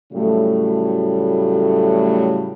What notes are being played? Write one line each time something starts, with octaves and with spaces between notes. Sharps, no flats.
A2 C#3 F#3 G3 A3